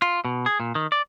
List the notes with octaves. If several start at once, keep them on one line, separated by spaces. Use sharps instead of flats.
F4
B2
G#4
A#2
D#3
D5